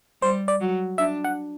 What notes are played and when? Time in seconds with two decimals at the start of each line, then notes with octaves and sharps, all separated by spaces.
0.22 G3 C5
0.48 D5
0.61 F#3
0.98 D4 E5
1.24 F#5